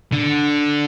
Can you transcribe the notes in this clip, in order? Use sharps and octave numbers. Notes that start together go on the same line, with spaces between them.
D3